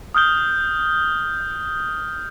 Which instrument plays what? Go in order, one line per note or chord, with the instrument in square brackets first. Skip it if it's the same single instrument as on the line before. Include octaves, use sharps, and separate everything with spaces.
[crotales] D#6 F6 G6 G7